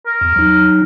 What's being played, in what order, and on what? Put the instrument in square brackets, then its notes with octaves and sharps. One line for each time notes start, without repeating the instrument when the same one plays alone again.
[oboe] A#4
[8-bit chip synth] E2
F#3 D#4